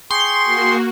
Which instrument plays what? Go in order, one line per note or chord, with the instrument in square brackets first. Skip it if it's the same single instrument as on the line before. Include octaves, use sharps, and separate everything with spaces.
[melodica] G#4 G5 C#6 [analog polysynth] C6
[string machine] A#3 F#4